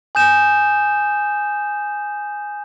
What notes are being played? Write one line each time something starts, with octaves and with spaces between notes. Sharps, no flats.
G#5 D#6 G6 E7